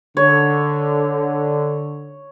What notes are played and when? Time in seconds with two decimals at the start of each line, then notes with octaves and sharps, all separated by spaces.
0.17 D3 C#5